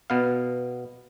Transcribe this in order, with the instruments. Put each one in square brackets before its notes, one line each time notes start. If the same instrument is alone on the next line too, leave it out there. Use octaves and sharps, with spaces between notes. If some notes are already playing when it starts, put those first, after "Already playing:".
[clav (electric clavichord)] B2 B3 F5